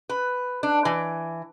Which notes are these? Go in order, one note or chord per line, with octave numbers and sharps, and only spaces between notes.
B4
D4
E3